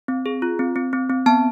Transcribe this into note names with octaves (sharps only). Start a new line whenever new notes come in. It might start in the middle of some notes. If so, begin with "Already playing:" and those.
C4
G#4
F4
C4
C4
C4
C4
B3 A5